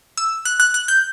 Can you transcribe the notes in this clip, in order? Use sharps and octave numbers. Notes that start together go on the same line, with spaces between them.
E6
F#6
F#6
F#6
G6